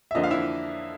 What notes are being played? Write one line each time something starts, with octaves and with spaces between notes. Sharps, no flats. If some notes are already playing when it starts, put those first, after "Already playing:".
E5
F2 D3 F3 A#3 D4 D#5
F5
E4 E5